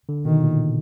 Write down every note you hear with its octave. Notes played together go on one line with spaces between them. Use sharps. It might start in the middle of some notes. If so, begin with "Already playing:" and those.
D3
B2 D#3
A#2